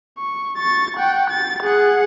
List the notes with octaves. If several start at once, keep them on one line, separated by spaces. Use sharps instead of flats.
C#6
C#6 A6
F#5 G5
A6
G#4 F#5